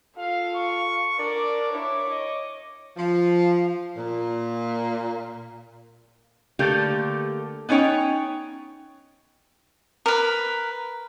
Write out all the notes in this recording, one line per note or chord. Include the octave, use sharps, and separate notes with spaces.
F4 A4 F5
C#6
D4 A#4 D5
E4 C#5 D6
D#5
F3
A#2
D3 A3 A#3 G4 A4
B3 C#4 D#4 C#5 G5
A#4 B4